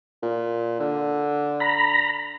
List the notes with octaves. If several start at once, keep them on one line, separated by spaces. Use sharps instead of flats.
A#2
D3
A#5 B5